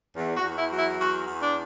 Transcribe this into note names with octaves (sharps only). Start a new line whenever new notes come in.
E2
F#4
E2
E4
F#3
E4
E2 F#4
E2
D4